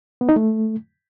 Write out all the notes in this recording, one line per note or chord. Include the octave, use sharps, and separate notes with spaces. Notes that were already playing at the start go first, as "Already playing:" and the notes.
B3
D#4
A3